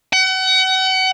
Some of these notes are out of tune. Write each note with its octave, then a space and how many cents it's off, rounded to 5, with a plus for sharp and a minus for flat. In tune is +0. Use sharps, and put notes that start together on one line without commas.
F#5 +35